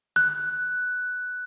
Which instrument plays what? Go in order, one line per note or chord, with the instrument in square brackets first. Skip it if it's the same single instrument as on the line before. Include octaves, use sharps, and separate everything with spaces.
[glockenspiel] F#6